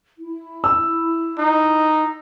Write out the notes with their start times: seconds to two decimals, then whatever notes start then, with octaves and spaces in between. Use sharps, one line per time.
0.18 E4
0.64 E6
1.39 D#4